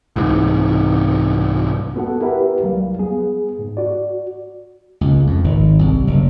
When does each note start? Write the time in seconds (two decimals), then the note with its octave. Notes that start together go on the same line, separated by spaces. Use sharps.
0.16 C2 G#2 E3
1.96 B3 F#4 A4 F#5
2.20 E4 G4 A#4 B4 E5
2.62 C2 F#3 G3 F5
2.99 B3 G#4
3.59 G#2
3.77 F#4 D5
5.01 C#2
5.27 F2
5.44 G#1
5.79 C2
6.07 F#1